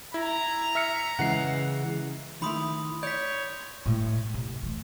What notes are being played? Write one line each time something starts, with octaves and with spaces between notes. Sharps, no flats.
E4 A#5
E5 F6 C#7
C#3 E3 G#3 F#5 C7
D#3 A3 E4 B5 C6 D#6
C#5 D5 G6 B6
A2 G#3
C3
E3 A3